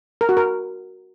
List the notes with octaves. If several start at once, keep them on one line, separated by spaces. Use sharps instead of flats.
A#4
F#4
A#4